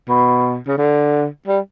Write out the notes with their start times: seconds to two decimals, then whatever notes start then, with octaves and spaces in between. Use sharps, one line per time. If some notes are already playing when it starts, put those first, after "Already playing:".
0.08 B2
0.67 C#3
0.78 D3
1.47 G3